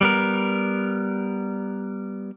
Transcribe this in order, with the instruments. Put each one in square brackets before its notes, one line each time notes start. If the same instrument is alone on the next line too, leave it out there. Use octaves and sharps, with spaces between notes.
[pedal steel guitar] G3 B3 A#4